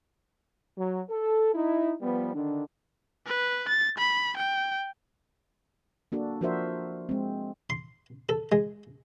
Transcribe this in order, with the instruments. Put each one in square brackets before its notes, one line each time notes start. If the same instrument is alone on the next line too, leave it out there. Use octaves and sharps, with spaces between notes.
[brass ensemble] F#3
A4
D#4 E4
F3 G3 B3
D3 D#3 D4
[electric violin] B4
A6
B5
G5
[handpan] A#3 D4 F#4 A4
F3 D4 F#4 A#4 C5 E5
G#3 C4
[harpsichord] C6
A4
G#3